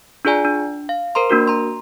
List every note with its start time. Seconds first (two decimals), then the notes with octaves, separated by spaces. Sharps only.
0.25 D4 F4 G#4 D5 G#5 A#5
0.45 D4
0.89 F5
1.15 A#4 C5 A#5 C6
1.30 A#3 D4 F#4 A#4
1.48 A#5 C6